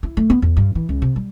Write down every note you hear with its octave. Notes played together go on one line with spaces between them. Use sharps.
E4
A3
B3
E2
G2
E3
C#2
C3
G3